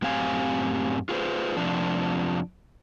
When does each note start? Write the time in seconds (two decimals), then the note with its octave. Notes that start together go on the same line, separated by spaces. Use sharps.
0.02 F#2 A2 C4 G4 F5 G#5
1.09 F4 G#4 B4 C5
1.57 F2 C3 F3 D4